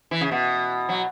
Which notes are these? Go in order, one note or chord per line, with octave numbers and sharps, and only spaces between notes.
E3
C#3
B2
F#3